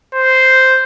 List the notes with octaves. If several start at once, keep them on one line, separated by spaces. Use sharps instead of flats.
C5